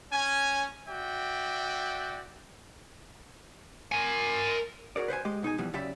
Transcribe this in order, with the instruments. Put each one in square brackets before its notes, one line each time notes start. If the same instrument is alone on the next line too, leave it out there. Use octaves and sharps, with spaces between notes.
[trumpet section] C#4 G#5
F#4 D5 E5 G5
[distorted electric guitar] A#4 G#5
[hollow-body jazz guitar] F#4 G#4 A#4 D5
B4 C5 F#5 G#5
G#3 G4 D#5
B2 D#4 G#4 G#5
F2 B2 E3 G3
F#2 C#3 G4 D5 E5 B5